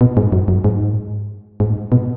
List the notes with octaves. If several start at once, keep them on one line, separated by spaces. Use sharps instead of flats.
B2
G#2
F#2
F#2
G#2
G#2
B2